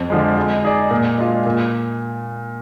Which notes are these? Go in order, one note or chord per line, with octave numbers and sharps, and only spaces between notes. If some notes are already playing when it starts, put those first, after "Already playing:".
Already playing: F2
D3 F3 G#3
G#3
D#4 G#4 D5
A#2
G#3 D4 F4
A#2